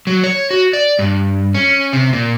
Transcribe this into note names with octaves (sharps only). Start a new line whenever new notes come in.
F#3
C#5
F#4
D5
G2
C#4
C3
A#2